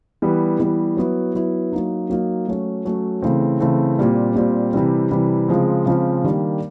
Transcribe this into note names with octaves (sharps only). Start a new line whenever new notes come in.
E3 G3 B3
E3 G3 B3
F#3 B3 E4
F#3 B3 E4
F#3 A#3 D#4
F#3 A#3 D#4
F#3 A3 C#4
F#3 A3 C#4
C#3 E3 A3 C4
C#3 E3 A3 C4
A#2 G3 C4
A#2 G3 C4
C3 E3 G3
C3 E3 G3
C#3 F3 G#3 C4
C#3 F3 G#3 C4
D#3 G3 A#3 D4